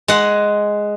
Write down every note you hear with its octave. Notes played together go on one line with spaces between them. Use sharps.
G#3 F#5